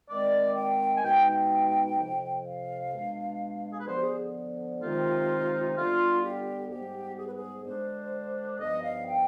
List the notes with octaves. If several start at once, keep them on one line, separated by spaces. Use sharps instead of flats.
D#3 G#3 C4 D5
G5
G#5
B2 G#3 B3 D#4 G5
G5
F2 C3 F3
F5
B2 G#3 D4
G#4
B4
D3 F3 B3 C5
G4
G#4
C3 D#3 G#3 C4 D#4 F4
D3 G3 B3 D4 F4
G4
G#2 G3 B3 G4
G#4
B4
G#4
D3 G#3 D4 C5
G2 F3 B3 D#4 D#5
F5
G5